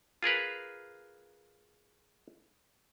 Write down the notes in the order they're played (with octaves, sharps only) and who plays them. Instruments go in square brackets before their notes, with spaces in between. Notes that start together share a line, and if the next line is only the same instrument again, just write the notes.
[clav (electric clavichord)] F4 G#4 A#4 B4